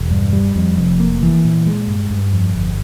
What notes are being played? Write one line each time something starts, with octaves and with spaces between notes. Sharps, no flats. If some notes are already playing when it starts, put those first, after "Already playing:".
Already playing: E1
G2
G3
F2
F1
A#3
E3
A#2
G#3
G2
G2
F2
G1